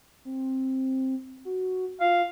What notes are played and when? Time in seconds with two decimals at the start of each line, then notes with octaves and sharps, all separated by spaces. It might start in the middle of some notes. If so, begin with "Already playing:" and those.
0.25 C4
1.45 F#4
2.01 F4 F5